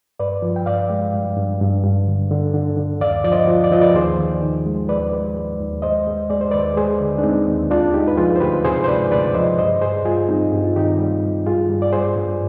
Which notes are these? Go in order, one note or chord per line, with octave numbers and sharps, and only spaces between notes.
G2 B4 D5
F3
G5
G2 D5 F5
G#3
G2
G2
G2
G2
D3
D3
D3
D3
D#2 D5 F5
F3 D5
C5 D#5
F3
D5
F3 D#5
B4 D5
D#2 G#4 C5
D#3
D#3
G#3
D#2 B4 D5
G#3
G#3
D#2
G#3 C5 D#5
G#3
G#3 D5
C5
D#2 B4 D5
G#3 G#4 C5
D3
D4
G#3 C4 D#4
D#2
D2 D4 F4
G#3 D#4 G4
B4
F3 F4 G#4
C5
D2 G4 B4
C3 G#4 C5
C5
G#3 B4 D5
D2 B4 D5
F3 C5 D#5
G2 C5 D#5
G2 G#4 C5
G3 F4 G#4
G3 C4 D#4
G2 G4
F4
D#3 D#4 G4
G3
G2
G2 F4 G#4
G3
D5
G3 G#4 C5
G2